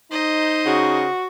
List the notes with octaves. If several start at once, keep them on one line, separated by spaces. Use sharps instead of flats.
D#4 C5 D#5
C#3 F#4